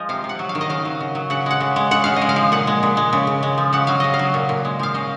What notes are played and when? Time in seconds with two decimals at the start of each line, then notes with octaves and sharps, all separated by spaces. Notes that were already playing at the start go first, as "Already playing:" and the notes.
Already playing: F3 G#3 D#5
0.09 C3 F5
0.24 C3
0.29 F#5
0.39 F#3
0.49 F5
0.55 D#3
0.61 D#5
0.69 C#3 F5
0.85 F#3
1.00 C#3
1.15 F#3
1.30 C#3 F#5
1.46 G#3 F#5
1.61 C#3
1.76 G#3
1.91 C#3 F#5
2.04 C#3 F5
2.16 D#5
2.21 G#3
2.29 F5
2.36 F3
2.52 A#2 F#5
2.67 G#3
2.83 A#2
2.97 G#3
3.13 C#3
3.27 C#3
3.43 G#3
3.58 F3
3.73 C#3 F#5
3.87 F#3 F5
4.00 C#3 D#5
4.14 F5
4.19 F#3
4.34 A#2
4.49 A#2
4.65 G#3
4.79 F3 F5
4.94 C#3 D#5